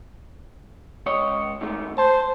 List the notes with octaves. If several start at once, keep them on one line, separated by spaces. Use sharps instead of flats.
C#2 C#5 D#5
G#2 D#3 A3
C5 A5